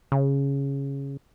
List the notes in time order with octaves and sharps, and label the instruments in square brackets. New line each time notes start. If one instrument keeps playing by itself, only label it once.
[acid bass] C#3